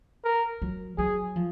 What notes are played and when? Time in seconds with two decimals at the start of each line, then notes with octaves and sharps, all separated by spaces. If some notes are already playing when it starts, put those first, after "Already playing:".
0.24 A#4
0.62 F#3
0.98 F#3 G#4
1.36 F3